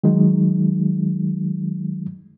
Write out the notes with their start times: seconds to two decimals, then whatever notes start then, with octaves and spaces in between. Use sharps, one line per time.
0.04 D#3 F#3 G#3 D#4